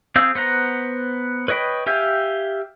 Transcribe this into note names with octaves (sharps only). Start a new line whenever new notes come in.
C4 G#4 F5 E6 G6
B3 C5 F#5 A#5
B4 C#5 D#5 G5 B5
G4 E5 F5 G5 G#5